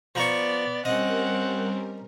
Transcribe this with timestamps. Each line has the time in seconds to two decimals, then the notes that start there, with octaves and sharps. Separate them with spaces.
0.15 F3 B3 D5 A#5 C#6
0.85 G3 C4 C#4 A#4 D#5 F#5